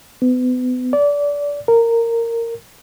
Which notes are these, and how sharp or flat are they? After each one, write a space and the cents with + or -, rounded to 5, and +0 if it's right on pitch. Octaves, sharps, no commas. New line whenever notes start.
B3 +35
D5 -25
A#4 -15